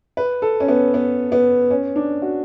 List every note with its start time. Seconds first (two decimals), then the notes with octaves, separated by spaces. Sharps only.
0.17 B4
0.42 A4
0.60 C#4
0.68 B3
0.94 B3
1.32 B3
1.71 C#4
1.96 D4
2.22 F#4